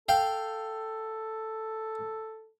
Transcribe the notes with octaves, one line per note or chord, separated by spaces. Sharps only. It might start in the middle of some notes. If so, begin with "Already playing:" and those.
A4 F5 G5